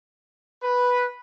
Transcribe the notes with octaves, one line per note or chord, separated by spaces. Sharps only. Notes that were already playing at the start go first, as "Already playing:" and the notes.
B4